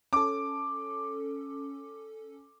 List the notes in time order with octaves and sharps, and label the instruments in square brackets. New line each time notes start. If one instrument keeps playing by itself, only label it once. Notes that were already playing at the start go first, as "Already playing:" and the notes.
[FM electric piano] C#4 A4 [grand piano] D6